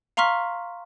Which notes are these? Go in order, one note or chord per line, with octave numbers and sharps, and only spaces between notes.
F5 A#5 C6 C#6 F6 B6